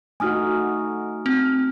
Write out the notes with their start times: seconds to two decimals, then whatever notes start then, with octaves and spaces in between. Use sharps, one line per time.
0.20 A3 D#4 F#4 G#5 D#6 F6
1.26 C4